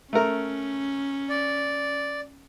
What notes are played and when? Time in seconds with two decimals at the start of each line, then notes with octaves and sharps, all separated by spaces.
0.13 A3 C#4 A#4
1.30 D5